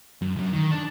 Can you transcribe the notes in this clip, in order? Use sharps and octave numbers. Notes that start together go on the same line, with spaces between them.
F#2
C2 F#2
D#3
D4